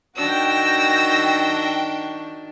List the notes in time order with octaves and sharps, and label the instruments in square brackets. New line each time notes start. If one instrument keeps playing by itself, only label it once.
[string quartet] D#3 D4 [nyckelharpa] F#4 [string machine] G5 [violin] E6 A#6